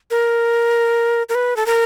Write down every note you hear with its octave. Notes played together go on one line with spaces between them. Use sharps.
A#4
A#4
B4
A4
A#4